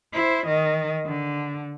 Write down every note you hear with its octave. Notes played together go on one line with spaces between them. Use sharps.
E4 C5
D#3 D#5
D3